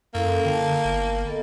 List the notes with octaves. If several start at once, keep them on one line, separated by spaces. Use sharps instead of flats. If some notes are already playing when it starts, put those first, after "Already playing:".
F#2 A#3 C#4 E4 A4
D3 G5 A5
G1
B3 A4 D#5